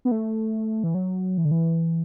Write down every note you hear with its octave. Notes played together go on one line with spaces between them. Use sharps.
B3
A3
E3
F#3
E3
D3
E3